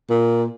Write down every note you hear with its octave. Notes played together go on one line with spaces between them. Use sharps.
A#2